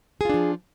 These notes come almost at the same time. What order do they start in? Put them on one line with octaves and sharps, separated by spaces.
G#4 F4 D4 F3